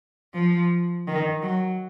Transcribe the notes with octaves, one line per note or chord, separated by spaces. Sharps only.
F3
D#3
F#3